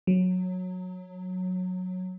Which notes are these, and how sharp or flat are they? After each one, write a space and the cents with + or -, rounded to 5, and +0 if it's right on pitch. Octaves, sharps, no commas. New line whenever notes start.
F#3 -15